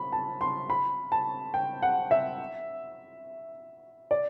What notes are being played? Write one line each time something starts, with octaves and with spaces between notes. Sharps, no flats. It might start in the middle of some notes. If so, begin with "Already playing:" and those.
Already playing: B5
A5
C6
B5
A5
G5
F#5
E5
D5